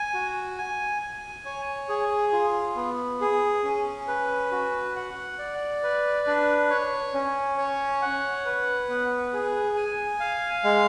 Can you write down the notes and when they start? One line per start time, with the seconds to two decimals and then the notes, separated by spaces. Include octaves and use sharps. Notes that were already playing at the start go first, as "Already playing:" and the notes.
Already playing: G#5
0.14 F#4
0.58 G#5
1.02 G#5
1.45 C#5
1.89 G#4
2.33 F4
2.76 B3
3.21 G#4
3.64 C#4
4.08 B4
4.52 F#4
4.96 F#5
5.39 D5
5.83 B4
6.27 D4
6.70 C#5
7.14 C#4
7.58 C#5
8.02 F#5
8.45 B4
8.89 B3
9.33 G#4
9.76 G#5
10.20 F5
10.64 G#3